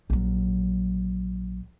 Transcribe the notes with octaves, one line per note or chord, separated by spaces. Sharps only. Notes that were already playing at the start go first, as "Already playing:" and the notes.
A#1 F#3